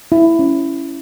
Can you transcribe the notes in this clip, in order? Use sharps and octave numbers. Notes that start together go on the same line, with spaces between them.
E4
C#4